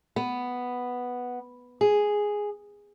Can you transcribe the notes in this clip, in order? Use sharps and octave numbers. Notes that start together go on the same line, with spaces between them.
B3
G#4